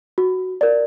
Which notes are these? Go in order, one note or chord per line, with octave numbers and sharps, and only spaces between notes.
F#4
A#4 D5